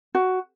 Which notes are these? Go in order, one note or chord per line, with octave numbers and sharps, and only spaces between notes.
F#4